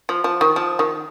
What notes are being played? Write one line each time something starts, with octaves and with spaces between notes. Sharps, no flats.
F3
F3
D#3
F3
D#3